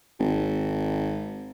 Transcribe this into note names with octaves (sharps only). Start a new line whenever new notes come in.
G#1